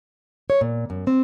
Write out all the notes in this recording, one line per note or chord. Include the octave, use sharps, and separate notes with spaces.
C#5
A#2
F#2
C4